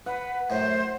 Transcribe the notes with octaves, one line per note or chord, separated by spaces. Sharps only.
B4 F#5
F#2 A2 C5